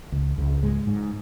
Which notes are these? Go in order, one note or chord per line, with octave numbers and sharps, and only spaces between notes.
C#2
C#2
G#2 G#3
G#2